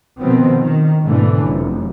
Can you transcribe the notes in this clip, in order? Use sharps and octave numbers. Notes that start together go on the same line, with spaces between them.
B2 D#3 F3 B3 C4
D#3
G#2 B2 D3 E3 A3
F1 F#2